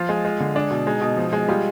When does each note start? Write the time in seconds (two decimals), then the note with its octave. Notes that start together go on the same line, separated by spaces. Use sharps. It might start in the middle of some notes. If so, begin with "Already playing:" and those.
Already playing: F3 F4
0.09 G#3
0.25 G#3
0.40 D3
0.55 G#3 D4
0.71 B2
0.86 G#3 D#4
1.01 B2
1.17 F3
1.33 G#3
1.48 G3 F4